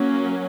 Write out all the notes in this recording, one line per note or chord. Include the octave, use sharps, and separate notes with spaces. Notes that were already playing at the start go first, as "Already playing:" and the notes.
Already playing: F#3 A#3 C#4